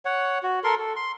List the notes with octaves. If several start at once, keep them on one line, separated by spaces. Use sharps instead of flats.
C#5 F#5
F#4
A4 A#4 C6
A4
C6